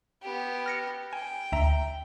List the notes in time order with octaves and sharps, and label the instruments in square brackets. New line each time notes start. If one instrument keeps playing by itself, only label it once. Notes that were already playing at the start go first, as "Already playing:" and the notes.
[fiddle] B3 G4
[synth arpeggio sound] F6 A#6 C#7
[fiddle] G5 [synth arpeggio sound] G#5
[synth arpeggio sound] D2 E5 A#5